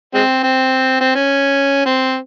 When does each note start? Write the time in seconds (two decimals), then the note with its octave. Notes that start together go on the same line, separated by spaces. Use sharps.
0.14 G#3 C4
0.43 C4
1.00 C4
1.15 C#4
1.86 C4